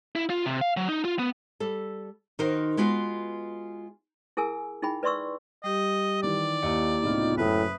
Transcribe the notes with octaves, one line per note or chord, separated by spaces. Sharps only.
E4
F4
C3
F5
F#3
D#4
F4
B3
G3 A4
D#3 D#4 F#4 A#4 C5
G#3 B3 F4 F#4
E4 G#4 A#4 G#5 E6
D#4 E4 G#4 G5 B5
B4 D5 E5 C6 C#6 E6
G3 G4 D#5
D#3 E3 D5
D#2 A#3 E4 G4 D#5 C#7
C#2 A2 C3 B3 D#4 F4
F#1 A2 B4 E5 D#6